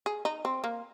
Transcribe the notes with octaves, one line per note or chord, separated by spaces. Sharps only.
G#4
D#4
C4
A#3